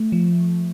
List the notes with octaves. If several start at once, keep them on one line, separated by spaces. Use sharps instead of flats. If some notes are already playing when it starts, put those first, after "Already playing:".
Already playing: A3
F3